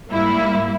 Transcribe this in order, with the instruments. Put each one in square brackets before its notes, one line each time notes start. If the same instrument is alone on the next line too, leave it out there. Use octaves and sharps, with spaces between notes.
[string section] G#2 G3 A#3 E4